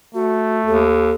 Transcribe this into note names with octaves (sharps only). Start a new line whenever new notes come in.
A3 F#4
D#2 A4